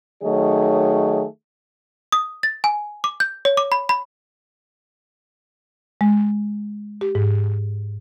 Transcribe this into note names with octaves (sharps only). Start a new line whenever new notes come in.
D#3 F#3 A3 G#4 C#5 D#5
D#6
A6
G#5
D6
G6
C#5
D6
B5
B5
G#3
G4
G#2